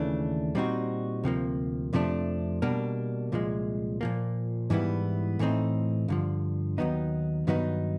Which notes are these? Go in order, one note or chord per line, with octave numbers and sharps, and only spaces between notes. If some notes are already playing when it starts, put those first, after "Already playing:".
Already playing: D#2 C#3 E3 A3 D4
A#2 G3 C4 D#4 F#4
D2 C3 F3 A#3
F2 C3 F3 A3 D4
B2 G3 A#3 D4
C2 A#2 F3 G#3
A#2 F3 A#3
G#2 E3 G3 B3 E4
A2 E3 A3 C4 D#4
G2 D3 F3
D#2 D#3 F#3 B3 D#4
G2 D#3 F#3 B3 D#4